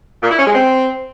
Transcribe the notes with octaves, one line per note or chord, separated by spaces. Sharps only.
A#2
E4
C#4
G#3
C4